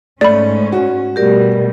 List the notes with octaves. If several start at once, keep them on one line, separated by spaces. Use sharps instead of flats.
G#2 A3 C#4 D5 B5
F#4
B2 G3 A3 G4 A#4 D5